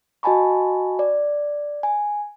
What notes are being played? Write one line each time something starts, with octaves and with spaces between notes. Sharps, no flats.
F#4 D#5 G#5 A5 B5 C#6
D5
G#5